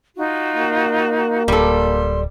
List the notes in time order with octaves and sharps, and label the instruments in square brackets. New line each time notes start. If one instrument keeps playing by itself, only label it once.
[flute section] D#4 F4 F#4
[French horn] A#3
[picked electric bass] D1 [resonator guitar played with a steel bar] G3 A4 [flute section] C6